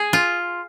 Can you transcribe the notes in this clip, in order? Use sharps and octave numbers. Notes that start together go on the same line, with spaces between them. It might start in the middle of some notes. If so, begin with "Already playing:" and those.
Already playing: G#4
F4